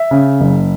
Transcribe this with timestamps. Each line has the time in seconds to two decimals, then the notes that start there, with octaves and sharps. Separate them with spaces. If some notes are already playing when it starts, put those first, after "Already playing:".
Already playing: E5
0.11 C#3
0.41 F#1